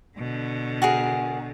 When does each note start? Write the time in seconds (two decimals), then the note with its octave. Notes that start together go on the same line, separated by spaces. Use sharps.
0.18 B2 D3
0.82 F#4 G#4 A#4